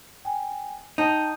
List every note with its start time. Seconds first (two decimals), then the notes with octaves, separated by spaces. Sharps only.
0.25 G5 G#5
0.98 D#4 G5 A5 G6